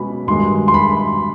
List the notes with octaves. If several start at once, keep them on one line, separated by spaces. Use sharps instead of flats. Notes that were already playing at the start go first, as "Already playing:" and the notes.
Already playing: B2 G#3 C#4 B5
G2 D#3 G#3 C6
C6
B5